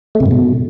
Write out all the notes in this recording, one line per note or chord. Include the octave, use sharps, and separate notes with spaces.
A3
C3
G2
B2